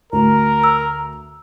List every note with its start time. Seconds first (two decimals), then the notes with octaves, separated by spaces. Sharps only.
0.12 D2 A#4 A#5
0.64 E6